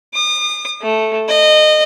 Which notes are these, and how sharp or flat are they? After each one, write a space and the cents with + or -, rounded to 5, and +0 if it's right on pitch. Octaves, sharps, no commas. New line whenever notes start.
D#6 -40
A3 -5
D#5 -25